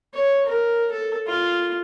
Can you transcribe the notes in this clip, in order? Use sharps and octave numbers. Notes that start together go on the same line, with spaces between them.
C#5
A#4
A4
F4